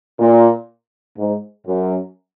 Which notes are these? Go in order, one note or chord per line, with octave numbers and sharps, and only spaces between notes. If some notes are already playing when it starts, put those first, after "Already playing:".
A#2
G#2
F#2